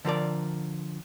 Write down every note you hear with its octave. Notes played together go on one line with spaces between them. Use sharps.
D3 F3 A#4 D5